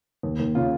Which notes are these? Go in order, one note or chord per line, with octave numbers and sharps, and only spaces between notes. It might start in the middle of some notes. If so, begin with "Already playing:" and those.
D#2
D#2
C#3 F4